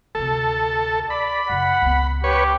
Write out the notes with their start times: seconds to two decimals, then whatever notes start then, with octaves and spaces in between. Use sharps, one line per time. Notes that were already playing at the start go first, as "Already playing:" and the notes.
0.15 D2 C3 A4
1.10 D5 B5
1.50 F#2 C#3 F#5
1.82 C#2 B3
2.24 G4 B4 C#5